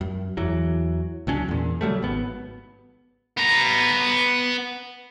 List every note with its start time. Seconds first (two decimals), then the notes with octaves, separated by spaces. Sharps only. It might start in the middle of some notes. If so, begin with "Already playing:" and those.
0.01 F#2
0.37 E2 E3 F#3
1.27 C#2 F#3 C#4 D4
1.48 E2 A#2
1.81 C#3 F#3 G3 A3
2.02 G#1 B3
3.37 B3 A#5